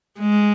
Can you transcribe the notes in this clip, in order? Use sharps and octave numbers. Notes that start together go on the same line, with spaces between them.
G#3